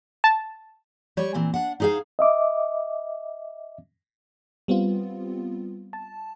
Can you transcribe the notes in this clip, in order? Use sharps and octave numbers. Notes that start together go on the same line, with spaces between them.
A5
G3 C#5
A#2 E3 C4
D4 F#5
D#4 E4 G#4 C5 F5
D#5 E5 D6
G3 B3 C4 F4
A5